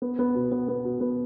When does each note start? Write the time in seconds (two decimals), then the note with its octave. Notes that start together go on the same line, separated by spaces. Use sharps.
0.02 B3
0.19 B3
0.35 B2
0.52 B3
0.68 B3
0.85 B2
1.00 B3